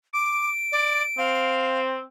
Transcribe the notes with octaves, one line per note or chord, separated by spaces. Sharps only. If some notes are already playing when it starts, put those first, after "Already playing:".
D6 D7
D5
C4 F5